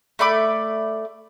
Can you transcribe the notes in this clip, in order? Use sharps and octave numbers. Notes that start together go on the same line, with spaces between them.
A3 D5 B5 D6